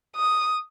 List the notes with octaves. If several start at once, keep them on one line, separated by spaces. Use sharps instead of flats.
D#6